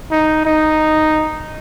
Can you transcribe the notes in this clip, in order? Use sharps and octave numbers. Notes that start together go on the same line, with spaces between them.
D#4
D#4